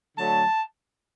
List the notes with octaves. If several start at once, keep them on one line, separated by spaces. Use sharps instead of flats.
D3 F#3 A3 A5